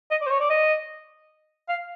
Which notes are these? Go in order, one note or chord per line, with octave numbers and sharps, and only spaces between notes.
D#5
D5
C5
C#5
D5
D#5
F5